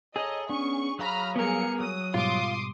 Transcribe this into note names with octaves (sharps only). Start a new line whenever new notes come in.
G#4 A4 C#5 D#5 A#5
B3 C#4 D4 C#6
F#3 F5 A#5 B5 C#6 F6
G3 A#3 B3 G#4 A#4 C#7
F#3 D#6
G#2 B2 G3 F4 C6 D6 D#6